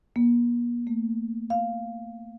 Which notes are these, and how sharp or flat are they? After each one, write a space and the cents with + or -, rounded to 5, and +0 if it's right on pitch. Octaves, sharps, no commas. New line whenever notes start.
A#3 +45
A3 +30
F5 +0